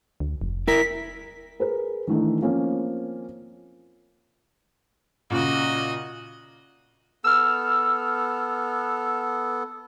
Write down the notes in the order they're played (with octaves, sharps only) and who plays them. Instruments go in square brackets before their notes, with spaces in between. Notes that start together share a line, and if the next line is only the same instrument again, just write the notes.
[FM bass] D2
F1
[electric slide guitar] E4 A#4 [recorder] B6
[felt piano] G#4 A#4 B4
D#3 E3 A3 D4 D#4
F3 A#3 C4 C#4
[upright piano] A#2 C#3 [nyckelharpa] F#4 D#5
[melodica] B3 A4 [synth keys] E6 F6